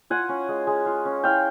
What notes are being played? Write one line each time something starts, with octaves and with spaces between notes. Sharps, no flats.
F4 F#5 G#5
C#4
G#3
G#3
F4
C#4
E4 F5 G5